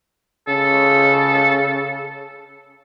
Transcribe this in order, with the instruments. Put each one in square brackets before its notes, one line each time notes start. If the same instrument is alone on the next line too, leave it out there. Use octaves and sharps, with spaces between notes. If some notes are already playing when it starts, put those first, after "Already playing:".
[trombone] C#3 [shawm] A4